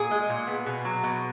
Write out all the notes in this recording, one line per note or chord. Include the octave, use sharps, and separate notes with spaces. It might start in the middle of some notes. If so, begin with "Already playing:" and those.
Already playing: A#2 G#4
G#3
A#2
B3
B2
F#3
B2